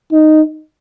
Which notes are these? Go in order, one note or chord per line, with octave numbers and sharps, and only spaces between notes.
D#4